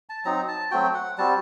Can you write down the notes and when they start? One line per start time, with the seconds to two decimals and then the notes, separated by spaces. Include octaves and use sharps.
0.09 A5
0.25 F#3 C4 D#4 A#5
0.48 A5
0.71 F#3 A3 C4 F#4 G5
0.95 F#5
1.18 G3 C4 F#4 A5